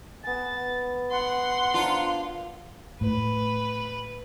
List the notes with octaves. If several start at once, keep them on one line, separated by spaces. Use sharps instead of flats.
B3 G#5 A6
F#5 C6
D4 F4 A#4 C5
A2 B4